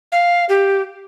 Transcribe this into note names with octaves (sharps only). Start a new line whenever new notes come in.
F5
G4